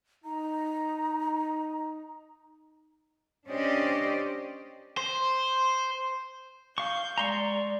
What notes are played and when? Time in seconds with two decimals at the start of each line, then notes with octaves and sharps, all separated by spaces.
0.25 D#4 A#5
3.47 C#4 D4 G4 C5 D5 D#5
4.97 C5
6.78 F5 C#6 G6
7.18 G#3 D5 A#5 C6 C#6